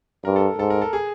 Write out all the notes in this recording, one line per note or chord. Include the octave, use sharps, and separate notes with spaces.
G2 A#4
A4
G#2 A4
A#4
A4
G#4